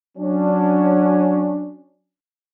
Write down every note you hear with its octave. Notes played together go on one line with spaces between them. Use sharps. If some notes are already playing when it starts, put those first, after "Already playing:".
F#3 C#4 D4